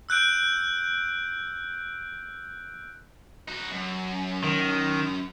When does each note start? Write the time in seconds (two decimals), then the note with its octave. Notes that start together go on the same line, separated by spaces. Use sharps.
0.09 E6 F#6 G6 D7
3.48 D#4 F#4
3.72 F#2
4.44 D#3